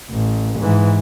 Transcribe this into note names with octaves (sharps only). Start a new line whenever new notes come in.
A1
G#2 E3